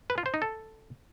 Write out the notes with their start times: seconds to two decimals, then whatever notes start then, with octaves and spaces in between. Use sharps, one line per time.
0.10 B4
0.18 F4
0.26 C5
0.34 D#4
0.42 A4